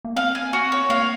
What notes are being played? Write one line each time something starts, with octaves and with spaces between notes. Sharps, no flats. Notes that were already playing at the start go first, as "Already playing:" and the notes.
A#3
C4 F5
G#5
F#4
C#5
A#3 F5